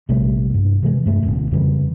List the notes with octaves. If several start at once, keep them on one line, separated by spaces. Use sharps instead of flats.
A#1 C3 G3 A3
G2
C3 E3 F3 G#3
G2 A3
E1 A1 D2
F2 C#3 E3 G3